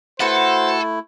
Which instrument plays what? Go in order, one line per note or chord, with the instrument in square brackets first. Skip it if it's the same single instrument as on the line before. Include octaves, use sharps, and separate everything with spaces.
[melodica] A3 E4 [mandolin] F#4 B4 F#5 [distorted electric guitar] A4 [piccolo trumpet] C5